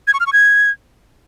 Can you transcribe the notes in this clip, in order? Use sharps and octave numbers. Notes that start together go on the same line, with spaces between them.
G#6
C#6
F6
C#6
G#6